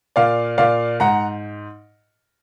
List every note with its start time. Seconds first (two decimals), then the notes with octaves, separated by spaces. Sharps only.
0.16 A#2 D5 F5
0.58 A#2 D5 F5
1.00 G#2 F#5 A#5